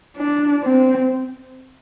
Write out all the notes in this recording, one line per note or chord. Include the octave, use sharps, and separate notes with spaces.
D4
C4